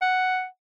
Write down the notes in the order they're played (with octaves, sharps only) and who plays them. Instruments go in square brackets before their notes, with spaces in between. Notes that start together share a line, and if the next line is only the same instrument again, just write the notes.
[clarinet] F#5